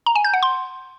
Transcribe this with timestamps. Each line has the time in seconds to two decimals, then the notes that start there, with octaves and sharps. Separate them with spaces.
0.06 A#5
0.15 G#5
0.24 G6
0.33 F#5
0.43 C6